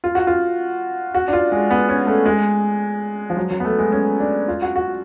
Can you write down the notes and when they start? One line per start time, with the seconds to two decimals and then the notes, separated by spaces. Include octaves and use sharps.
0.04 F4
0.15 F#4
0.27 F4
1.14 F#4
1.28 D4
1.33 F4
1.52 G#3
1.71 B3
1.89 C#4
2.07 A3
2.26 G#3
3.30 F3
3.37 F#3
3.51 F#3
3.60 B3
3.65 A3
3.79 G#3
3.92 C#4
4.20 D4
4.48 F4
4.62 F#4
4.76 F#4